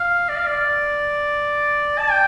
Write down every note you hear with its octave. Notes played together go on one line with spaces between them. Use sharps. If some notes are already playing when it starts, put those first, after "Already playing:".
Already playing: F5
D5
F5
D5
A5
G5